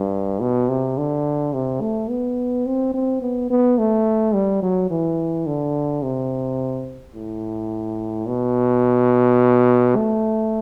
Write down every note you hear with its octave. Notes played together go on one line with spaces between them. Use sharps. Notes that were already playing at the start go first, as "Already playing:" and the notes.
Already playing: G2
B2
C3
D3
C3
A3
B3
C4
C4
B3
B3
A3
G3
F#3
E3
D3
C3
A2
B2
A3